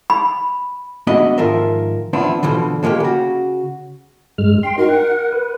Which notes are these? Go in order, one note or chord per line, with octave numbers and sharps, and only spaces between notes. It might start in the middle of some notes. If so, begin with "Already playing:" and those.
B5
G#3 B3 D4 F#4 D#5 E5
G#2 D#3 F3 F4 A#4 E5
F3 B3 C4 D4 E4
B2 D3 E3 F3
F3 G#3 A#3 C#4 G4
C#3 F#4
G2 G#3 F6
G5 C6
D#4 F#4 A#4
F#5
B4